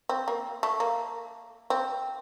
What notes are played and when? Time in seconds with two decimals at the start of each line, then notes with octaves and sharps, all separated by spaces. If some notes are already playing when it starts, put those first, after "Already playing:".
0.09 C4
0.28 A#3
0.63 A3
0.80 A#3
1.70 C4